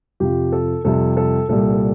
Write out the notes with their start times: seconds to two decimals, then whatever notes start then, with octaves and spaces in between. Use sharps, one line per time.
0.20 F2 C3 F3 G4
0.52 A4
0.84 F2 C3 G3 A4
1.17 A4
1.49 C2 A#2 G3 A4